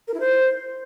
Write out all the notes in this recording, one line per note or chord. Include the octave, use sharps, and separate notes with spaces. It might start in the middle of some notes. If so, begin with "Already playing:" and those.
A#4
E4
C5